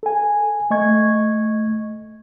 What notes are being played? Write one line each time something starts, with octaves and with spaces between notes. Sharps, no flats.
A4 G#5
A3 D#5 C#6 G#6